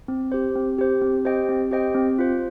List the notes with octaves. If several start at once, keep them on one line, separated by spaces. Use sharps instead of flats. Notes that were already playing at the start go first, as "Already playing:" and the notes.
C4
G4 C5
C4
G4 C5
C4
G4 C5 D#5 G5
C4
G4 C5 D#5 G5
C4
F4 C5